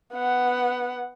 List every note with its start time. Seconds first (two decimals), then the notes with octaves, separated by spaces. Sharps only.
0.13 B3 F#5